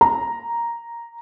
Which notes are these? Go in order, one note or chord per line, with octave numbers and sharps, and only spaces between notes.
A#5